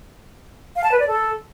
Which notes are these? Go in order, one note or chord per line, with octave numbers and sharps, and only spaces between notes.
F5
A5
B4
D5
A4